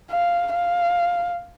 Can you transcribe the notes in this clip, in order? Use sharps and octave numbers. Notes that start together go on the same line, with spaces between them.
F5
F5